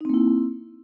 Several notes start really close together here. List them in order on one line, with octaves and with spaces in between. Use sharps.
D#4 C4 A#3 E4